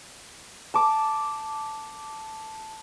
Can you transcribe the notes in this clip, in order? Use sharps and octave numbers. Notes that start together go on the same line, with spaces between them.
A5 D6